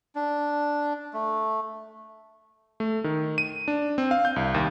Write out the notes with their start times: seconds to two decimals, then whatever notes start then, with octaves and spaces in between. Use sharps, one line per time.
0.15 D4
1.13 A3
2.80 A3
3.04 D#3
3.38 D#7
3.68 D4
3.98 C4
4.11 F5
4.25 G6
4.36 C2
4.54 D#2